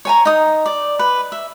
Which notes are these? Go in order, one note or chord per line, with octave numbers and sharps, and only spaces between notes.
C#5 G#5 A#5
D#4 D#6
D5
B4
E5